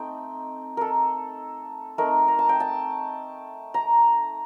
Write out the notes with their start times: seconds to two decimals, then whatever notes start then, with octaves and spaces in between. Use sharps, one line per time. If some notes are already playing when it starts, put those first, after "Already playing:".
Already playing: A3 C4 D#4 G5
0.77 A4 A#4
1.98 A3 C4 D#4 A#4
2.28 A#5
2.39 A5
2.49 G5
2.60 A5
3.74 A#5